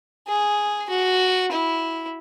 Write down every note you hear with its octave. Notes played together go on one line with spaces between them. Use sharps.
G#4
F#4
E4